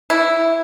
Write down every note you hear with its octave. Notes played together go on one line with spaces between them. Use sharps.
E4